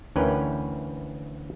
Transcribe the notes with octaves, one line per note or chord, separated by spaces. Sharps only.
D2 E3 C#4 A#4 B4 G5